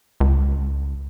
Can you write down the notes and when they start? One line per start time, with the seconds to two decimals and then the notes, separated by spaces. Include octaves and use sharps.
0.20 C#2